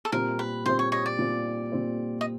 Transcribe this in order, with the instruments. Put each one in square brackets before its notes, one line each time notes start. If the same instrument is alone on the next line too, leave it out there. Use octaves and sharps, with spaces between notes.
[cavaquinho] A4
[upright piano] A#2 G3 C4 [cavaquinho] A#4
[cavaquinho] B4
[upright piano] A#2 G3 C4 [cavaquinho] C5
[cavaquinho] C#5
C#5 D#5
D5
[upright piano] A#2 G3 C4
A#2 G3 C4
[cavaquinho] D#5